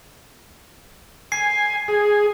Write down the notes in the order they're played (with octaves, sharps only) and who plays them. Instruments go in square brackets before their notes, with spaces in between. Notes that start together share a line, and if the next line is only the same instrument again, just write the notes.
[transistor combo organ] G#5 [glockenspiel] C7
[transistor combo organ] G#4